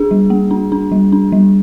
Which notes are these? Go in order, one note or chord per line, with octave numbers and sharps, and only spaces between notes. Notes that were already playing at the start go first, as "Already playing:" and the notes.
Already playing: D4 G#4
G3
A#3
D4
D4
G3
D4
G3